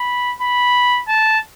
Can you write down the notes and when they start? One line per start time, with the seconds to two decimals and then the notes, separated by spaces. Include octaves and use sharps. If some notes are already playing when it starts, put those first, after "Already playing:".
Already playing: B5
0.41 B5
1.08 A5